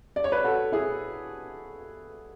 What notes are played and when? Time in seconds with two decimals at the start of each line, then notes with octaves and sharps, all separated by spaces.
0.16 D5
0.24 C#5
0.32 B4 D5
0.44 F#4 A4
0.72 E4 G#4